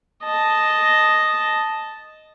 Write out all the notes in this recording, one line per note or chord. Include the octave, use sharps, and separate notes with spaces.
D#5 A5